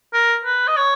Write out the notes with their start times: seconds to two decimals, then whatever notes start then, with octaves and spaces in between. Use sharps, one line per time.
0.13 A#4
0.45 B4
0.67 D#5
0.77 C#5